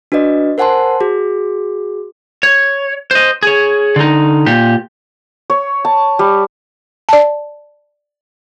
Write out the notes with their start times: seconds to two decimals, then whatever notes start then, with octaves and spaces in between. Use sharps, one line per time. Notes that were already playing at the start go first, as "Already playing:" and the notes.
0.12 D4 F#4 B4 D5 D#5
0.58 A#4 C5 F#5 G#5 A5 C6
1.00 F#4 G#4
2.43 C#5
3.11 C5 D#5
3.43 G#4 C#5
3.96 D3 D#4
4.46 A#2 G4
5.50 C#5
5.85 A5
6.19 G3
7.09 D5 A5